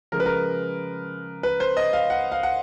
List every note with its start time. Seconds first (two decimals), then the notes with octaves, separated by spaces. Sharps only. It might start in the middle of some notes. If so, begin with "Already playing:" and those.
0.12 C#3 F3 G#3 A#4
0.20 B4
0.26 A#4
1.43 B4
1.60 C5
1.77 D#5
1.93 F5
2.10 F#5
2.32 F5
2.43 F#5